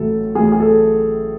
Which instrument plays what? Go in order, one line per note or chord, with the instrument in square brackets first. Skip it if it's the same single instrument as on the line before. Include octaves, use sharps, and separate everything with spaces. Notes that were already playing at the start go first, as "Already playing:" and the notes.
Already playing: [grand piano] A1 A2 F#3 A4
A1 A2 F#3 G#4
G#4
A4